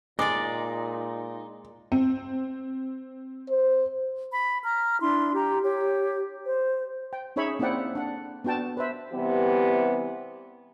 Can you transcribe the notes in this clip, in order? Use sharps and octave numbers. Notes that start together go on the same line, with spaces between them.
A#2 G#3 D#4 D5 D6
C4
C5
B5
A#5 F6
D4 E4 C6
G4 A#5
G4 C#5
C5
G5
C#4 D#4 G#4 C#5 E5 B5
A#3 C4 E4 D5 F#5 G5
D4 F#5
B3 D4 F#4 G5 A5
B4 C5 E5
C3 E3 G3 B3 G4